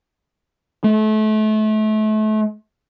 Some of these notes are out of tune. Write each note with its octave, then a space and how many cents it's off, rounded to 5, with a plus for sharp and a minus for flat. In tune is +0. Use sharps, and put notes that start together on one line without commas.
A3 -30